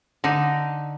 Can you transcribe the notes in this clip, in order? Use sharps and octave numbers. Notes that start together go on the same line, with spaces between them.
D3 D#4